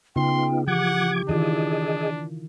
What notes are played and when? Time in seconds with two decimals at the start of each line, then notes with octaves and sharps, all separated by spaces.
0.16 C#3 B3 D#4 F4 G5 C6
0.68 E3 F3 G4 F#5 D6 G#6
1.29 D#3 E3 D4 F4 G#4 D#5